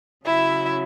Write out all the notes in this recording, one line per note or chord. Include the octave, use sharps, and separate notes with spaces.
C#3 F#3 E4 E5